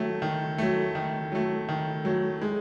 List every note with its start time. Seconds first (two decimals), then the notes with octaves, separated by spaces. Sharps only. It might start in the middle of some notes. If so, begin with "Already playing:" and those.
Already playing: D#3 F#3 A3
0.22 D#3
0.58 F#3 A3
0.95 D#3
1.32 F#3 A3
1.69 D#3
2.05 F#3 A3
2.42 G#3